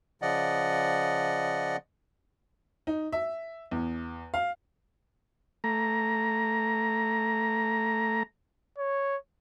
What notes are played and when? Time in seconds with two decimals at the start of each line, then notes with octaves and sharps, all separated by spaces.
0.22 C#3 F3 D5 D#5 F#5
2.87 D#4
3.12 E5
3.71 E2
4.34 F5
5.64 A3 A#5
8.78 C#5